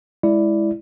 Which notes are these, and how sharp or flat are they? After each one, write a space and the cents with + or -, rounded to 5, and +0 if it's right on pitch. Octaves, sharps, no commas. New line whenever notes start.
G#3 +0 E4 +0 D5 +0